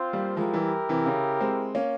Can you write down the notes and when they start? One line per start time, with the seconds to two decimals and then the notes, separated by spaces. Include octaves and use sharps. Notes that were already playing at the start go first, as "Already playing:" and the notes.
Already playing: C4 F4 C5
0.13 G3 A#3
0.37 F3 G#3 E4 G4 A#4
0.54 E3 G3
0.89 C3 E3
1.06 C#3
1.41 G#3 C4
1.75 A#3 C#4